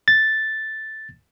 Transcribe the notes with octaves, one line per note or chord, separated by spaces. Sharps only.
A6